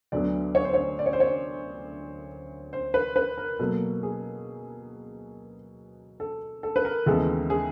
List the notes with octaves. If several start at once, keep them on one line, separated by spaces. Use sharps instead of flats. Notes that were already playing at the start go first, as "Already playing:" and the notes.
D2 D3 F#3 B3 D5
C#5
C5
C#5
D5
C#5
C5
C#5
C5
B4
B4
A#4
B2 F#3 A#3 A4
G#4
A4
A4
B4
A#4
D#2 C#3 E3 G#3 B3 A4
G#4